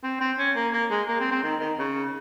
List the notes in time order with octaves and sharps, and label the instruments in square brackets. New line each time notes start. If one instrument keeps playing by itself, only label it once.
[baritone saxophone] C4
C4
C#4
A#3
A#3
G#3
A#3
C4
C4
D#3
D#3
C#3